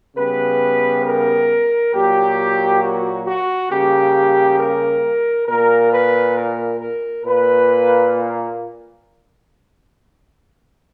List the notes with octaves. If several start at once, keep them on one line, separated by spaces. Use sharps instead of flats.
C#3 G3 B3 B4
A#4
A#2 F#3 A#3 G4
F#4
F#4
C#3 G3 A#3 G4
A#4
A#2 A#3 A#4
B4
A#4
A#4
A#2 A#3 B4